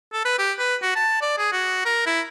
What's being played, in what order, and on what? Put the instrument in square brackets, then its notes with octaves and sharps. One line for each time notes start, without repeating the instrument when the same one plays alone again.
[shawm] A4
B4
G4
B4
F#4
A5
D5
G#4
F#4
A#4
E4